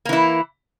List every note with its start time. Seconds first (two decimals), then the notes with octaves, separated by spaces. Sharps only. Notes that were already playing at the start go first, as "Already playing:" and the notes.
0.05 A#3
0.09 E3
0.13 E4